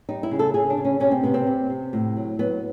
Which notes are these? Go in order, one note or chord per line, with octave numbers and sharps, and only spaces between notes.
G3 D#4
E4
C#3
A4
C#3 G#4
D4
C#3
C#4
C3 C#4
C4
C3 B3
C4
C3
C3
A2
F#3
F#3 B3